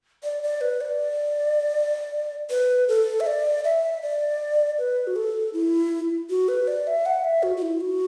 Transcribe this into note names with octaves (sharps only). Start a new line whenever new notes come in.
D5
D5
B4
D5
B4
A4
E5
D5
E5
D5
B4
F#4
A4
E4
F#4
B4
D5
E5
F#5
E5
F#4
F#4
E4
F#4